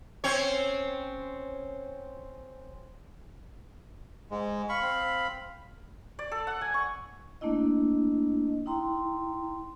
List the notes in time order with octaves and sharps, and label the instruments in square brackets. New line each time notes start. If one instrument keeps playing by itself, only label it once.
[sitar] C4 C#4 C#5
[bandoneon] G#2 G#3
[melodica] F5 B5 [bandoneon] C#6
[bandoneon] C4
[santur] D5
A4
F#5
G#5
C#6
[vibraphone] A3 A#3 D4 E4 D#5
D#4 E4 G5 A#5 C6